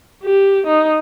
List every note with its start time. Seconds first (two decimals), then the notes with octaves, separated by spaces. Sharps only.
0.23 G4
0.67 D#4